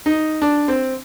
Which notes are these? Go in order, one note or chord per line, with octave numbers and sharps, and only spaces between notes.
D#4
D4
C4